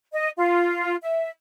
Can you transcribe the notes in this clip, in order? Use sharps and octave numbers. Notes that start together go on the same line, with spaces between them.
D#5
F4
E5